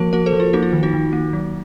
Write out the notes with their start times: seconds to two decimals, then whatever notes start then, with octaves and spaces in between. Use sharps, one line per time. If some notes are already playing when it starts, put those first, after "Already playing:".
Already playing: F3 A#3 F#4 A#4
0.13 A#3 F#4 A#4
0.26 A4 C5
0.33 F3
0.40 F4
0.53 A#3 D#4 F#4
0.63 F4
0.73 D#3
0.83 D#4 F#4
0.94 D#3
1.13 A#3
1.33 F#3